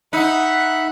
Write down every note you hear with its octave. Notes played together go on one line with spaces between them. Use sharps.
D#4 E5 F#5 B5 F#6